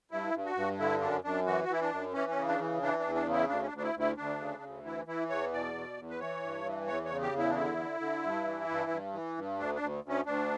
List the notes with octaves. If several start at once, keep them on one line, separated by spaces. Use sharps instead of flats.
G2 E4
G2
F#4
G2
D3 E4
F#2 D4
F#2 D4
E3 F#4
F#4
E3 E4
D4
F#2
E3 C#4
C#4
C#3
D4
E3
E3 D4
E2 D4
D4
C#3
E4
D2 D4
C#4
D4
D2
D4
E4
D2
E4
D2 D4
C#3
D2
E3 E4
E3 E4
E2 C#5
B2 D5
B2
E2
B4
E3 C#5
G2
E3
E2 C#5
C#5
C#3
G4
E2
E4
D4
D3 E4
D3
D3
G2
E3
G2
G2
E3
G2
D2 D4
D4
D2
D2 C#4
D2 D4